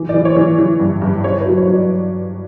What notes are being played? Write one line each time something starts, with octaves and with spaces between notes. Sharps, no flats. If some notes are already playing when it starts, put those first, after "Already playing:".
Already playing: E3
D5
E3
C#5
E3
E3
G2
G2
G2 C#5
B4
F#3
C#5
F#3
D5